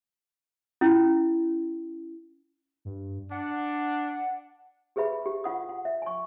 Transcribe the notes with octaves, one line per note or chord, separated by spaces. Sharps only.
C#4 E4
G2
D4 F#5
G4 G#4 B4 E5 B5
G4
F4 F#5 D#6
F#5
E5
G#5 C#6